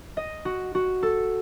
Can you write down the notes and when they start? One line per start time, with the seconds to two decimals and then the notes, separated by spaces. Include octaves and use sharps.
0.17 D#5
0.45 F#4
0.75 F#4
1.03 A4